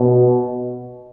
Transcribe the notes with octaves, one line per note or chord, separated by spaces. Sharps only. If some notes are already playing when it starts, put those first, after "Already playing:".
Already playing: B2